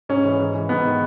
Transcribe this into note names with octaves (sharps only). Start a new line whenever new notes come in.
G#2 C#4
E3
G#2
E3
G#2 B3
D#3